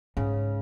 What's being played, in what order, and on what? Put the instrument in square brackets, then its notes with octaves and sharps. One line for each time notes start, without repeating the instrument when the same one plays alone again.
[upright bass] G#2 [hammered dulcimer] C#3